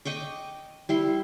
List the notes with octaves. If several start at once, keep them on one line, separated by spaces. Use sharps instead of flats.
D#5 G5 C#6 D6
G3 E4 C6